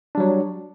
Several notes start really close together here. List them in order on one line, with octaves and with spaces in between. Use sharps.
D4 G3 F#3